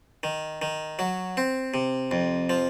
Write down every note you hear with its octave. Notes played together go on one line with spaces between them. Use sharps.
D#3
D#3
F#3
C4
C3
F2
F3